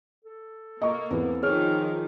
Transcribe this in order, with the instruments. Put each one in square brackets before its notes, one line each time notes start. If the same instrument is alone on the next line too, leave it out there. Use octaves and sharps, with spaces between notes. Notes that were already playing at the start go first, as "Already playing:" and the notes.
[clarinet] A4
[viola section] A#3 [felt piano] D#5 C#6
[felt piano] E2 B3 [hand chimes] C4 E4 B4
[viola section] D#3 F3 [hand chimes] G#4 [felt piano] C#5 [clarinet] F6